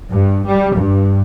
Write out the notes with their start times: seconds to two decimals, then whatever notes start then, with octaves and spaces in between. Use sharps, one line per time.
0.12 G2
0.47 G3
0.76 G2